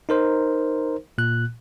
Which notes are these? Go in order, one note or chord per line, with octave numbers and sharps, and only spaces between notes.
D#4 A#4 C5
A#2 F#6